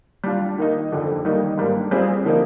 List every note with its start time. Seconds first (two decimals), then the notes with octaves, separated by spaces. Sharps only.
0.24 G3 D4 F4
0.58 D#3 A#3 D#4
0.92 F2 D3 F3
1.25 D#3 G3 A#3 D#4
1.58 G#2 G3 A#3 D4
1.91 G3 C4 F4 G#4
2.24 D3 F3 A#3 D#4